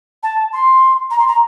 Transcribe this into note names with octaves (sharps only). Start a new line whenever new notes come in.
A5
C6
A#5
C6
A#5